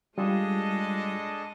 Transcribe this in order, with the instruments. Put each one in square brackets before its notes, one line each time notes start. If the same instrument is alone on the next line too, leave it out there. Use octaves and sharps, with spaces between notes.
[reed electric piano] G3 F4 [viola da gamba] G#3 D#5 [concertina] D4 G#4 A4